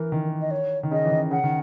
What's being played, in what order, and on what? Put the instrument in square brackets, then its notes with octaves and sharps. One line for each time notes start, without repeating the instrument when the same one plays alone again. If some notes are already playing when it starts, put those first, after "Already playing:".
Already playing: [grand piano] E3 [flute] A#4
[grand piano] D#3
[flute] D#5
C#5
[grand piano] D#3
[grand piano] C#3 [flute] D#5
[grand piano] E3
D#3
[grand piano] C#3 [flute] F#5
[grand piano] D#3